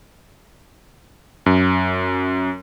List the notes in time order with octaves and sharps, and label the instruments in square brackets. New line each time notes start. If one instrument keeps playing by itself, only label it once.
[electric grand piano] F#2